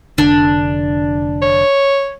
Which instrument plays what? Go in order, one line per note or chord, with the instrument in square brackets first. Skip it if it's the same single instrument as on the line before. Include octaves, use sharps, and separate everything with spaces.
[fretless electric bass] F1 D3 [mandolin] D4
[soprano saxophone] C#5